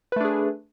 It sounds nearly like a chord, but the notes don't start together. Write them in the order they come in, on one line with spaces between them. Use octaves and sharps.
B4 A3 D4 G#4